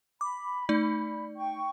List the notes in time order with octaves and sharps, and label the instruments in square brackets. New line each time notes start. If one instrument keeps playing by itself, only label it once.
[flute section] B5 [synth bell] D6
[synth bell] A3 D#4 D5
[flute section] G5 C#6